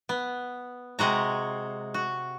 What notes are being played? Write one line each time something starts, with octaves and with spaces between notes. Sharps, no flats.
B3
C3 G#3 F#4 A#5
F#4